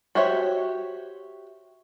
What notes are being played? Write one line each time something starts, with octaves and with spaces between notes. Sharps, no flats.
F#4 G4 C5 C#5 E5